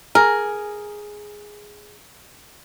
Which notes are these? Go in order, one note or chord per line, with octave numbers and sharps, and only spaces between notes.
G#4 A#4